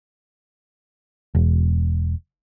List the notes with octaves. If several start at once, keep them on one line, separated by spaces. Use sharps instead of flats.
E1